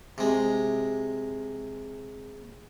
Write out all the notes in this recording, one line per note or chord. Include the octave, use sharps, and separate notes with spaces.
C3 G#3